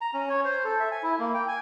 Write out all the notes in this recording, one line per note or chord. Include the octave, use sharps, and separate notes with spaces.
A#5
C#4
C#5
C5
A4
E5
G#5
E4
A#3
G5
G#5